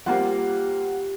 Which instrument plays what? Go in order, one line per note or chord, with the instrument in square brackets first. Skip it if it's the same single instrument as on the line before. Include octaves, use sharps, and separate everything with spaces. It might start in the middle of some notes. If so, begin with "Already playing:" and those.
[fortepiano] G3 A#3 C4 [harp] F4 G4 [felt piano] F#5